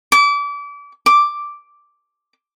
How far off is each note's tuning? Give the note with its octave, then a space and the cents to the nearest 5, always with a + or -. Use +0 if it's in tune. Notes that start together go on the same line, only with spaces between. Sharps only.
D6 -30
D6 +0